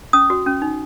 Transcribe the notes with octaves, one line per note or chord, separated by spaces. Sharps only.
C#4 D#6
F#4
C#4
D#4